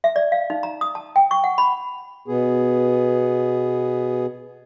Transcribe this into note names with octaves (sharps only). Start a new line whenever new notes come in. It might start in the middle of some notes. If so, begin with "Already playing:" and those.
E5
D5
F5
D#4
A#5
D#6
A5
G5
C#6
F#5
B5
B2 B3 G#4